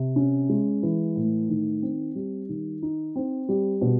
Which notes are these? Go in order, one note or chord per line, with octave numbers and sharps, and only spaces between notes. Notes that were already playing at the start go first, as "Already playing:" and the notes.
Already playing: C3
C#4
G#3
E3
A2
D#3
C4
G3
D#3
D#4
C4
G3
B2